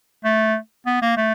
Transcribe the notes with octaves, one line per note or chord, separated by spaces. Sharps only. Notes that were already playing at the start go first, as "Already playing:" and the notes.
A3
B3
A#3
A3